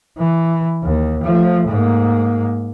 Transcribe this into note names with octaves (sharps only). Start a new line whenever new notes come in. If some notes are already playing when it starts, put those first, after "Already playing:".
E3
D#2
F3 A3
G#2 A#3